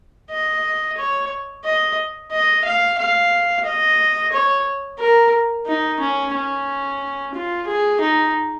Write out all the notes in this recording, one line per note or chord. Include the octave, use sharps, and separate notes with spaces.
D#5
C#5
D#5
D#5
F5
F5
D#5
C#5
A#4
D#4
C#4
C#4
F4
G#4
D#4